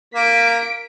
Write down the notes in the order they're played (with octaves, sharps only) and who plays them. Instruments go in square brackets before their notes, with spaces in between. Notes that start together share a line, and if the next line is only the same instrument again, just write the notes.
[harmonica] A#3 [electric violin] B6 D7